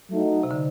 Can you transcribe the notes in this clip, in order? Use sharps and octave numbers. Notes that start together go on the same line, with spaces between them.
F#3 A3 D#4 F#4
C3
D3